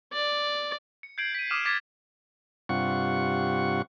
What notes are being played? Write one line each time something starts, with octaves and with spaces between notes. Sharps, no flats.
D5
C#7
G6 G#6 C7 D7 F#7
B6 D#7
D6 D#6 F6 D#7 E7 F#7
D6 G#6 A6 B6 D7 D#7
G2 C3 F4 F#5 C#6